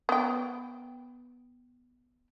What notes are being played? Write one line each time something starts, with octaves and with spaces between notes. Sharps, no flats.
B3 G5